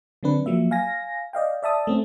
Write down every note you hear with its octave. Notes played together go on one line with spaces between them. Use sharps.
D3 F#3 C4 D4 B4
F3 F#3 A#3 E5
F5 G#5 A#6
D5 D#5 F5 G5
D5 E5 A5 D#6
A3 C4 C#4